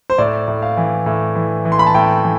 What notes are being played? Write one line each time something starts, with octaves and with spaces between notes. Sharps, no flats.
C5
A2 D5
A2
F5
E3
A2
E3
E3
C6
B5
A5
A2 G5
E3